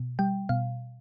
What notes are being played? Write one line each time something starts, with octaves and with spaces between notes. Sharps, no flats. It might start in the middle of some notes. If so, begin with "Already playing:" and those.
Already playing: B2
G3 G5
B2 F5